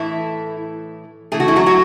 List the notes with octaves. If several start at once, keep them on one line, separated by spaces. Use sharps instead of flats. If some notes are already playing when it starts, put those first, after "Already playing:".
Already playing: A2 E3 A3 E4
C#3 E3 A3 G#4
F#4
E4
F#3 F#4
F#3 F#4